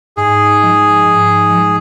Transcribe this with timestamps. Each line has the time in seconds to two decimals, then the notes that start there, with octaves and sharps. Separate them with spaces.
0.17 G#2 G#4
0.61 F3 G#3
1.05 G#2
1.49 F3 G#3